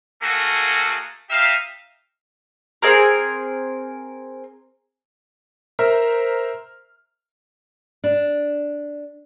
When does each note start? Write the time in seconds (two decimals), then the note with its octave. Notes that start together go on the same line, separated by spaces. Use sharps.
0.22 A3 A#3 F#4 G#4 A4
1.30 D#4 G4 E5 F5
2.82 C4 G#4 A#4
5.79 A#4 C5 E5 A#5 F6
8.04 D4